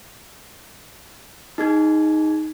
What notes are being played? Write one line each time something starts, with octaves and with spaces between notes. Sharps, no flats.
D#4 G#4 G#6